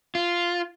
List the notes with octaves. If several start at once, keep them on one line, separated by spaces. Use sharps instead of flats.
F4